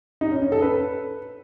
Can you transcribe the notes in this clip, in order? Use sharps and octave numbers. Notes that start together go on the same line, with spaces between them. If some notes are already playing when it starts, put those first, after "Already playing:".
D#4
C#4
C#4
A4
B4